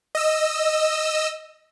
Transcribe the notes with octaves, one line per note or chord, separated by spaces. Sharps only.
D#5 E6